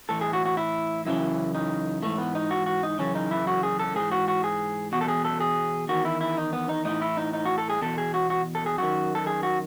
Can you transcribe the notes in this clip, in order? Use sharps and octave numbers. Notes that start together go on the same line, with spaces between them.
A2 E3 A4
G#4
F#4
F#4
E4
F#2 C#3 E3 E4
D#4
G#2 E3 A3
B3
D#4
F#4
F#4
D#4
F#2 C#3 E3 C#4
D#4
E4
F#4
G#4
A4
G#2 E3 G#4
F#4
F#4
G#4
E2 B2 F#4
A4
G#4
A4
G#4
E2 D#3 F#4
E4
E4
D#4
B3
D#4
A2 E3 D#4
E4
D#4
D#4
F#4
A4
G#4
E2 B2 A4
G#4
F#4
F#4
A4
G#4
F#2 D#3 F#4
A4
G#4
F#4